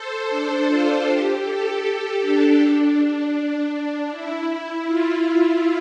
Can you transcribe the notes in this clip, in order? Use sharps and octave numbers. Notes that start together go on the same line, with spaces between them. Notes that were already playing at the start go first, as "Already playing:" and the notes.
Already playing: A4 C5
D4
F4
G4
A4
G4
D4
E4
F4